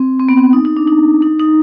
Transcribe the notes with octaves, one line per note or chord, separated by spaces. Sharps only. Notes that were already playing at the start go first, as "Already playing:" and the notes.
Already playing: C4
C4
B3
C4
D#4
D#4
D4
D#4
D#4
D#4